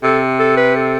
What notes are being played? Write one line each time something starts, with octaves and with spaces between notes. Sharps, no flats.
C3 A4
A4
B4
A4